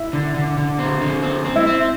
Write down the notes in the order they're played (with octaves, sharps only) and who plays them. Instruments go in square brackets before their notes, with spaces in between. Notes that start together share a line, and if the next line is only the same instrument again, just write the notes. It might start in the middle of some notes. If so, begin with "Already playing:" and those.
Already playing: [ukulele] E4 E5
[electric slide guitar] D3
D3
D3
C4
D3
C4
C4
[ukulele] E4 E5
[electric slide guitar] C4